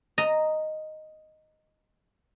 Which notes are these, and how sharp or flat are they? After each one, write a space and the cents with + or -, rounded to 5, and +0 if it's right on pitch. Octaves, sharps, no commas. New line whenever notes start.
D#5 +0 A#5 -5